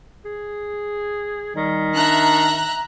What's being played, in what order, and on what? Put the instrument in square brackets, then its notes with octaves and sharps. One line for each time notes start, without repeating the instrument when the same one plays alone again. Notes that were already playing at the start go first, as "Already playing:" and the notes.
[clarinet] G#4
[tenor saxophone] D#3 [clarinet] G3
[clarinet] D4 [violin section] E5 A#5 F#6